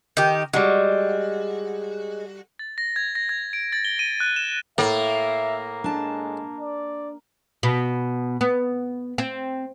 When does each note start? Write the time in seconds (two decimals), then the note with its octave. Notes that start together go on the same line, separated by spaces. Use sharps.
0.17 D#3 G4
0.53 G3 G#3 F#4
2.59 A6
2.78 A#6
2.96 G#6
3.15 A#6
3.29 G#6
3.53 D7
3.73 A6
3.85 G7
3.99 D#7
4.20 F#6
4.36 E7
4.78 A2 A#3 E5
5.84 G#3 D4 A5
6.61 D5
7.63 B2
8.41 B3
9.18 C4